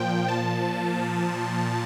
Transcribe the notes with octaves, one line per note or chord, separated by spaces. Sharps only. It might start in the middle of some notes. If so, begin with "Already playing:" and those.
Already playing: A#2 F3 G5
A5